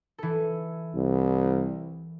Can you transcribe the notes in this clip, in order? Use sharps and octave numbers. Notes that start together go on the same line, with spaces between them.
E3 A4
C2